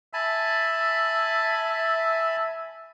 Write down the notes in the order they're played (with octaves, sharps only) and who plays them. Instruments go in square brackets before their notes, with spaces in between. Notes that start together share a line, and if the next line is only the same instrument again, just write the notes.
[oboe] E5 [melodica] G#5 A5 B5